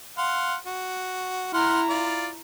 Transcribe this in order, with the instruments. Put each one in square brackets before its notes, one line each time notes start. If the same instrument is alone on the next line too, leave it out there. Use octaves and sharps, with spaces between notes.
[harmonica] F5 F#5 C6
F#4
[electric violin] E4 A#5 [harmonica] F#5 C6 F6
[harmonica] F4 D5